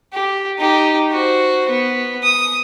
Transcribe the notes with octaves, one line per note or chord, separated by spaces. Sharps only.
G4
D#4 G4
F#4 C5
B3
D#6